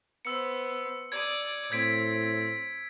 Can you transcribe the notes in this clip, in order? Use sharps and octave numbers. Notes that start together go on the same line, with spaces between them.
B3 C5 E6 C#7
D5 D#6 G#6
A2 C4 G#6 B6 D7